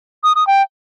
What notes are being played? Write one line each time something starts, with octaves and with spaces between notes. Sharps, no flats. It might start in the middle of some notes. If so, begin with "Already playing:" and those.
D#6
D#6
G5